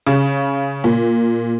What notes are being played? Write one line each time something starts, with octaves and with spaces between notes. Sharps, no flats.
C#3
A#2